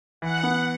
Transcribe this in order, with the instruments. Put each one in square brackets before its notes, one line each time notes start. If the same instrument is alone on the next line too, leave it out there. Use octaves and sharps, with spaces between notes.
[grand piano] E3 [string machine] F#5
[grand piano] B3